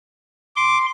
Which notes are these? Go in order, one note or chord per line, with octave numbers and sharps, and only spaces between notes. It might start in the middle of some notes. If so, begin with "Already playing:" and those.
C6 D6